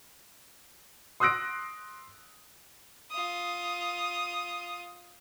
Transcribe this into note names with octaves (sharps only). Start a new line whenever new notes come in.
C6 D#6 E6 F#6 A#6 D7
F4 D#6